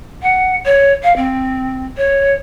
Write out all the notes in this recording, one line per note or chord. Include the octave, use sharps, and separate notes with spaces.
F#5
C#5
F5
C4
C#5